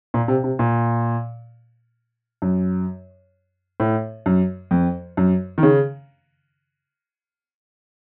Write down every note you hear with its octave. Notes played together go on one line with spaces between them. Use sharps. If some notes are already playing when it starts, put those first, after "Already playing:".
A#2
C3
C3
A#2
F#2
A2
F#2
F2
F#2
D#3
C#3